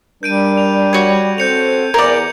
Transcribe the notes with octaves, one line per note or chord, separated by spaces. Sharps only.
G3 D4 A#4 G6 D7 D#7
F7
F#4 C#5 G#6
C4 A4 C5 G6 C#7 F7
E2 A#4 D5 G#6 F7